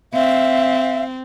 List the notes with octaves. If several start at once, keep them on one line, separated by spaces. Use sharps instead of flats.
C4 E5 F5